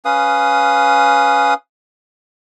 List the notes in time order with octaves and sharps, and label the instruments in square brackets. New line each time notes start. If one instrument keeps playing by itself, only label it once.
[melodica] C#4 B4 F5 D#6